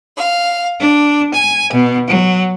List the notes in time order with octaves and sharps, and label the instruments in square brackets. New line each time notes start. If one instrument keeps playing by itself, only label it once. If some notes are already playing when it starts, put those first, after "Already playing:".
[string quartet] F5
D4
G#5
B2
F#3